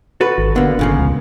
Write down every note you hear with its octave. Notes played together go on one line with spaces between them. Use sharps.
F#4 A4 B4
G#1
D3 A#3 B3
G1 A#2 C#3 F3
C#2